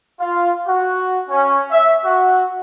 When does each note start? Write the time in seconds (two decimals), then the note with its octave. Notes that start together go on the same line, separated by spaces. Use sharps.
0.20 F4
0.68 F#4
1.29 C#4
1.71 E5
2.03 F#4